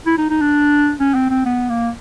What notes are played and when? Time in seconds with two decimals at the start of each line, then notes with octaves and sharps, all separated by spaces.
0.06 E4
0.18 D#4
0.30 D#4
0.41 D4
1.00 C#4
1.15 C4
1.30 C4
1.45 B3
1.69 A#3